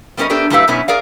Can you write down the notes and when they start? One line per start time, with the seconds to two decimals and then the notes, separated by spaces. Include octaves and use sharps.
0.17 G3 B3 C#4 G#4 A#4 D#5
0.29 A3 B3 D4 G4 A4 A#4
0.50 F#2 A3 E4 G4 B4 F5
0.68 F#2 B2 B3 C#4 E4
0.88 G#4 A#4 D5 F5